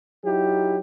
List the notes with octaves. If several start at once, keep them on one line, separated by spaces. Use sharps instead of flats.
F#3 D#4 E4 G4